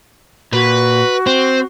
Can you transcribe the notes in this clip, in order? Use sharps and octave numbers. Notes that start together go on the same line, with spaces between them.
A#2 F#4 B4
C4 C5